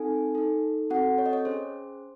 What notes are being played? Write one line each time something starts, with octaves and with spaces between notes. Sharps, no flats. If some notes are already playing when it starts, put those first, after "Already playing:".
Already playing: C4 D#4 A4 G#5
D#4 A4
C4 F#4 A4 F#5
C#5
D#5
C#5
C#4 G#4 C5